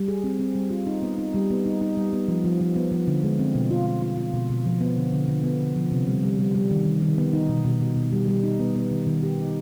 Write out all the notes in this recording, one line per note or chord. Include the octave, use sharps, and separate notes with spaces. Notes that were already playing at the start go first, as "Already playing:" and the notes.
Already playing: G3
G#4
C4
C4
G3
F4
D#4
B3
D#4
G3
B3
D#4
D#4
G3
B3
F3
F3
F3
B3
F3
D3
G#3
C4
B2
F4
F4
F4
F4
B2
B2
F3
B3
D3
D3
D3
B3
D3
F3
C3
G3
G3
G3
G3
D#3
D#3
D#3
B3
D#4
B2
B2
B2
B2
G3
G3
D#4
B3
B3
D#3
D#3
G4
D#4